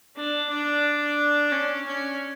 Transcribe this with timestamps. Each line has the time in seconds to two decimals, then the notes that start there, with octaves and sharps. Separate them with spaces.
0.16 D4
0.50 D4
1.52 C#4
1.86 C#4